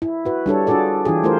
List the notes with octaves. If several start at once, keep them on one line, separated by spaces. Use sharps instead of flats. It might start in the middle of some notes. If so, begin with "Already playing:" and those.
E4
F#4 B4
G3 D4 A4 C#5
D4 F4 F#4 G#4 A4 D5
E3 D4 F4 G4 G#4
A3 E4 F4 A#4 C5